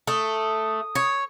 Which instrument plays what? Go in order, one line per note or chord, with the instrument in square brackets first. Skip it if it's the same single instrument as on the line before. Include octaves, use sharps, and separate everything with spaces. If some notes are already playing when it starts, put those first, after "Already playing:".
[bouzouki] A3 [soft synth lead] D#6
[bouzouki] C#5